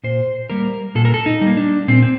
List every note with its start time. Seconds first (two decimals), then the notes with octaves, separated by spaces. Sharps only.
0.04 A#2 C5
0.50 G3 A#3 A#4
0.95 A#2 A4
1.05 A#4
1.14 A4
1.26 D#4
1.41 G3
1.47 A#3
1.57 D4
1.88 A#2 C4
2.02 C4